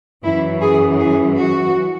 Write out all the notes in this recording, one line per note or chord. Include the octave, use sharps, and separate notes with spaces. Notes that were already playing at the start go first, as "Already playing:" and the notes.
F#2 E3 E4
G#4
G#4
F#4